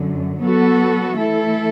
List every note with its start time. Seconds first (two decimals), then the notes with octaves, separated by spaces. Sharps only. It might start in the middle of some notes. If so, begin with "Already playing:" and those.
Already playing: F#2 D3 F#3
0.40 F#3 B3 F#4 A4
1.18 E3 A3 E4 A4